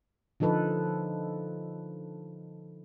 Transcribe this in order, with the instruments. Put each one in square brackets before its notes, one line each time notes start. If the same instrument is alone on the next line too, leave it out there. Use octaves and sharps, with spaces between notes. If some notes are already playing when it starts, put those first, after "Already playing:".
[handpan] D3 F3 D#4 A4 B4